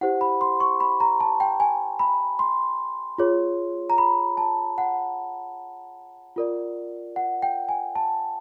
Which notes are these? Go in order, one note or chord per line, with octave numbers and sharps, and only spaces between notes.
E4 G4 C5 F#5
B5
C6
C#6
B5
A#5
A5
G5
G#5
B5
C6
F4 G#4 C#5
A#5
B5
A5
F#5
F4 A#4 D5
F#5
G5
G#5
A5